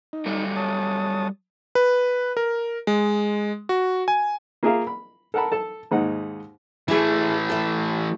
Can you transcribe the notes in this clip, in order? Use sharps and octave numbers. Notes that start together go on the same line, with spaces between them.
D#4
F#3 G3 A4
C#5 A5 D#6
B4
A#4
G#3
F#4
G#5
A#3 F4 G#4 A#4 E5 F5
B5
A4 A#4 F#5 A5 B5
A4 A5
D#2 G#2 D#4 F#5
E3 A3 E4 G#4
A4 E5